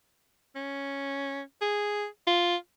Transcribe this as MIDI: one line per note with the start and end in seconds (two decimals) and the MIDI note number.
0.56 1.41 61
1.61 2.06 68
2.27 2.56 65